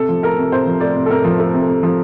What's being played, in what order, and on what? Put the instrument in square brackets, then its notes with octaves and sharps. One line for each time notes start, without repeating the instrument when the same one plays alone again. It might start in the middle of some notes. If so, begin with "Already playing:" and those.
Already playing: [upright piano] C3 A4
F3
A3 A#4
C3
C3 C5
F3
A3 D5
C3
A4
C3 A#4
F3
A3
C3
C3
F3